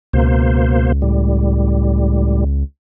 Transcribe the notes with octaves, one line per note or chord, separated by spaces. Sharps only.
C#2 B2 A#3 C5
A2 G3